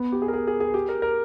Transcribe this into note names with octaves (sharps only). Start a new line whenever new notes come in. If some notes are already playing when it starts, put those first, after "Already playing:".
Already playing: B3
G4
G#4
A#4
G#4
G#4
G#4
G4
A#4
A#4